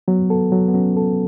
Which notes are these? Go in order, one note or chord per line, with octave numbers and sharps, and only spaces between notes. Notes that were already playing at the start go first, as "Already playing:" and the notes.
F#3 B3
B3 A4
F#3
B3
F#3 C#4
A4